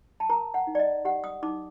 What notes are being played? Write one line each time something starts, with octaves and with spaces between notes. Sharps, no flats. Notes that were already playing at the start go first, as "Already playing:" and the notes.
A5
A#4 A#5
F#5
D#4
D5
D#5
G4 F#5
D#6
D#4 D6